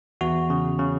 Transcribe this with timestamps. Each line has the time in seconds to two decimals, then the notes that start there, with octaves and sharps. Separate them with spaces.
0.21 E2 F#4
0.50 C#3
0.79 C#3